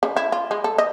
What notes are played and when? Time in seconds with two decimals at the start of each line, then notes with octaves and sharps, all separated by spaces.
0.03 C#3
0.16 E4
0.32 F4
0.51 G#3
0.64 A4
0.78 D#5